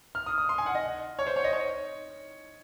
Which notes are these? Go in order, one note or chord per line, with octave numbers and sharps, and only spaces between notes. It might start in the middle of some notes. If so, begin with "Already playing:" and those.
F6
D#6
D#6
C6
G#5
F#5
D#5
C#5
C5
C#5
D#5
C#5